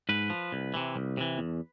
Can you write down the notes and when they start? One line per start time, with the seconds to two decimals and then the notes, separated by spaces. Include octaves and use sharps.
0.09 G#2 B4
0.30 F3
0.52 C2
0.74 C3 E3
0.96 C2
1.17 C3 E3
1.38 E2